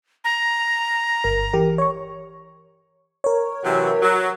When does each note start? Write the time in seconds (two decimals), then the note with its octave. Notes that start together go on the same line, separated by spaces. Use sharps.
0.24 A#5
1.24 G1 A#4
1.53 E3 G4 A#4
1.78 C#5 C#6
3.24 A#4 C#5
3.64 C3 E3 F#3
4.02 F#3